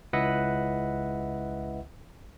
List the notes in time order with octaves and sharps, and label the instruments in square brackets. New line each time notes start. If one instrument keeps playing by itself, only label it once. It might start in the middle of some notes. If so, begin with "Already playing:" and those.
[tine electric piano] C#2 E4 B4 D#5 E5 F#5